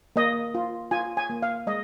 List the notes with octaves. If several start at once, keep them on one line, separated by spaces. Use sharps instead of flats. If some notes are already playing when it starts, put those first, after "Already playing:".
A#3 D#5
F4
F4 G#5
G#5
A#3
F5
G#3 D#5